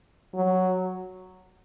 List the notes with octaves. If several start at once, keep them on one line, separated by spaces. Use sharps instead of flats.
F#3